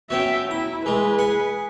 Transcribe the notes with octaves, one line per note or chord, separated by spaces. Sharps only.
F#3 B3 C#4 E5 G5
E4 A#5
E3 G#3 G#4 B4
F#5 G#5